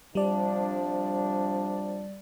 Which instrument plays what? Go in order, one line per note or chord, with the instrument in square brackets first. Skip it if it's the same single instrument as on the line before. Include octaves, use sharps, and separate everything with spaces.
[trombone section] C3 F3 D4 [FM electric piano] G3 D5